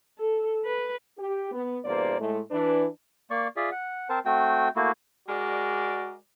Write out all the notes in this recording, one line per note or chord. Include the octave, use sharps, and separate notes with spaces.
A4
B4
G4
B3
E2 G2 B2 A#3 C5 D5
A2 G#3 A3
E3 D4 B4
A#3 D5 C#6
F4 G#4 D5 E5
F#5
C4 A#4 C5 A5
A3 C4 F#4 G5
A3 A#3 E4 F#4
G#3 F#4 A#4 D5